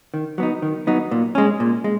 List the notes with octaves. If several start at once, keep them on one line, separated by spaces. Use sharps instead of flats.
D#3
F#3 B3 D#4
D#3
F#3 B3 D#4
A#2
G#3 C#4
A#2
G#3